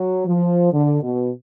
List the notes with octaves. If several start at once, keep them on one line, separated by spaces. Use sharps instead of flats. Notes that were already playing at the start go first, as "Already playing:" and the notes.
Already playing: F#3
F3
D3
B2